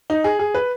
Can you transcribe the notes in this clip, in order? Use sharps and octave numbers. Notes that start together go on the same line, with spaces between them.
D#4
G#4
G#4
B4